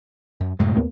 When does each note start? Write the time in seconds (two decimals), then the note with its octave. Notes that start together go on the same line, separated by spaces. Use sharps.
0.40 F#2
0.59 F#2 A2 C3 G#3
0.76 D#2 A#3 B3